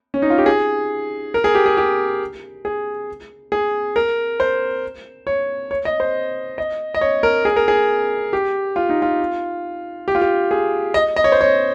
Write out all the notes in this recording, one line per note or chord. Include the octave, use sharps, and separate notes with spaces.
C#4
D#4
F4
G4
G#4
A#4
G#4
G4
G#4
G4
G#4
G#4
A#4
C5
C#5
C#5
D#5
C5
D#5
D#5
C#5
A#4
G#4
A#4
G#4
G4
F4
D#4
F4
G4
F4
G4
G#4
D#5
D#5
C#5
C5
C#5